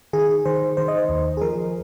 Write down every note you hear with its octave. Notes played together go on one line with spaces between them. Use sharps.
D#3 G#4
D#3 C5
D#3 C5
D#5
C5
D#2
G#4
F3 A#4